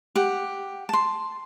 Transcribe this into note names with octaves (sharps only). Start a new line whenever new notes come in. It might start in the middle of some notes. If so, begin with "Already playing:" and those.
G4 F#5
A5 C6